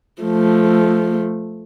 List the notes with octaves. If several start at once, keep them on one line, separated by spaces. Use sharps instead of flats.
F3 A3